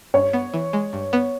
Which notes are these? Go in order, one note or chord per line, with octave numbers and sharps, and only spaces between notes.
G2 C#5
B3
E3
G#3
G2
B3